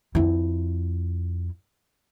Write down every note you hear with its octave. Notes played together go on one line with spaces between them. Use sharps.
F2 E4